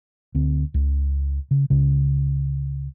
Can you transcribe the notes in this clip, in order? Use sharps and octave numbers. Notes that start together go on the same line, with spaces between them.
D2 C4
C#2
C#3
C#2 C#3